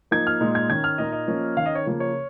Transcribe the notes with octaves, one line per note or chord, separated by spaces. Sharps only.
F3 A#3 D#4 G#6
F6
A#2 G#3 D#4
G#6
D#3 C#4 G#6
F6
A#2 A#3 D#4 D#5
D#5
F3 A#3 C#4
D#3 C#4 F5
D#5
C#5
C#3 F3 A#3
C#5